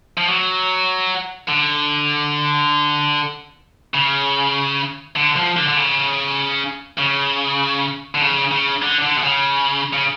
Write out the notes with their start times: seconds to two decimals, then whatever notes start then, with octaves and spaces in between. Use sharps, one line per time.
0.18 F3
0.28 F#3
1.49 D3
3.94 C#3
5.16 D3
5.36 F3
5.57 D3
5.68 D3
5.77 C#3
6.99 C#3
8.15 D3
8.22 C#3
8.52 C#3
8.82 D3
9.02 D3
9.17 B2
9.23 C#3
9.93 C#3